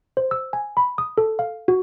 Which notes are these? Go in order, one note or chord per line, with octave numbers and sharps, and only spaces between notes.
C5
E6
G#5
B5
D#6
A4
F5
F#4